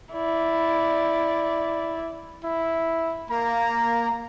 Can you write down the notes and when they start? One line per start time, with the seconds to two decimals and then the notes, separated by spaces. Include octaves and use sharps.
0.13 E4 D5
2.44 E4
3.30 A#3 A#5